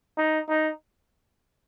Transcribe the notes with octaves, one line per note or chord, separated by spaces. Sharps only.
D#4
D#4